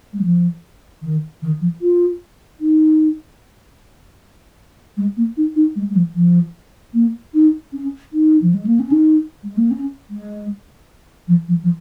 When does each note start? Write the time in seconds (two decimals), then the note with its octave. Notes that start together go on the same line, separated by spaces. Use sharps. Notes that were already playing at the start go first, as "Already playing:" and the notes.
0.13 G#3
0.23 F3
1.02 D#3
1.42 D#3
1.61 F3
1.82 F4
2.60 D#4
4.97 G#3
5.17 A#3
5.37 D#4
5.56 D#4
5.76 G#3
5.90 G#3
5.96 F3
6.15 F3
6.94 A#3
7.34 D#4
7.73 C#4
8.13 D#4
8.42 F3
8.54 G#3
8.67 A#3
8.80 C#4
8.91 D#4
9.44 G#3
9.57 A#3
9.71 C#4
10.10 G#3
11.28 F3
11.48 F3
11.63 F3